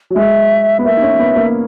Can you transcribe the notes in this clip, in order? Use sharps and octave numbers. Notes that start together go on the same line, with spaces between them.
F#3
G#3 E5
B3
A#3 E5
D#4
C#4
B3
A#3